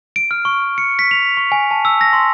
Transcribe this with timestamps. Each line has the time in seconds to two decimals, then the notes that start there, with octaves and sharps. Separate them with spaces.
0.16 D7
0.31 F6
0.45 C#6
0.78 C#7
0.99 B6
1.11 F7
1.37 C#6
1.52 G#5
1.71 A5
1.85 E6
2.01 A#6
2.13 C6